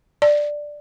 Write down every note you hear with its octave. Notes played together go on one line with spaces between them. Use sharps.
D5